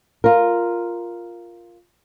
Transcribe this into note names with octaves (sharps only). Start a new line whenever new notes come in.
F4 A#4